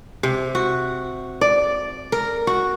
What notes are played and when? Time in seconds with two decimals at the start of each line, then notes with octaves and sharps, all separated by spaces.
0.23 C3
0.55 F#4
1.41 D5
2.12 A#4
2.47 F#4